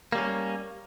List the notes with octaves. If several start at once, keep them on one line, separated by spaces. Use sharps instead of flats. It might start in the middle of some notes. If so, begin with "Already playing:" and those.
G3 A#3 C#4